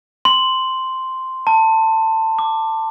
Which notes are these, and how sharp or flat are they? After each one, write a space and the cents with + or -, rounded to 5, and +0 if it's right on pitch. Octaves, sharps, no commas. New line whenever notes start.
C6 -5
A5 +20
D6 +15